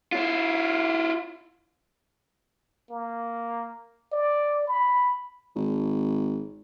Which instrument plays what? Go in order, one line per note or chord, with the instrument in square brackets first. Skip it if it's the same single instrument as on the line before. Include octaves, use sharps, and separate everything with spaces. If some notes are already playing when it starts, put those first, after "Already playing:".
[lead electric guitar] E4 F4
[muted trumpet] A#3
D5
B5
[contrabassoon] G#1